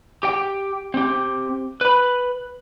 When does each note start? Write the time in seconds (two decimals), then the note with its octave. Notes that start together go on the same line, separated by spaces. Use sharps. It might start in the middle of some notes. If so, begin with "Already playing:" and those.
0.23 G4 G5
0.94 C4 G4
1.81 B4 B5